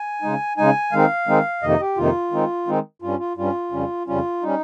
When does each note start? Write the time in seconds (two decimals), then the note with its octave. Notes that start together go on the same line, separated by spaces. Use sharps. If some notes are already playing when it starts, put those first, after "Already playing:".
Already playing: G#5
0.22 C#3 G#3 D#4
0.57 C#3 G#3 D#4 G#5
0.92 D#3 G#3 C4 D#4 F5
1.27 D#3 G#3 C4 D#4
1.63 F2 C3 D#3 A#3 D#4 D#5
1.80 G4
1.97 F2 C3 D#3 A#3 D#4 F4
2.32 D#3 G#3 C4 D#4
2.67 D#3 G#3 C4 D#4
3.02 G2 G3 C#4 F4
3.19 F4
3.37 G2 G3 C#4 F4
3.72 F2 C#3 G3 C#4
4.07 F2 C#3 G3 C#4 F4
4.43 G3 C#4 D#4